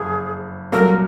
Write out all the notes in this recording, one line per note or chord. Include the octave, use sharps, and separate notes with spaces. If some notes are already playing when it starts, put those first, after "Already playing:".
Already playing: F#1 F2 G#4
C2 A#2 F#3 A3 A#4